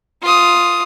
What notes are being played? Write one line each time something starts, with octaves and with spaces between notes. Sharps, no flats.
F4 D#6